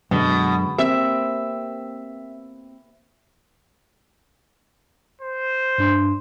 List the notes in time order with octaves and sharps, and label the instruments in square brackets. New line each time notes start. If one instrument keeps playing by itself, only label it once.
[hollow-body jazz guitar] F#2 D3 G#3 [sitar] B2
[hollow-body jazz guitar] A#3 C4 G4 [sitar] E5
[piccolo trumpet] C5
[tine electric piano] G2 D4 C6